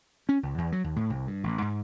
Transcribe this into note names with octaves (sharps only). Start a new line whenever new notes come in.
C#4
C#2
E2
F#3
D#2
A2
C2
G2
A1
G#2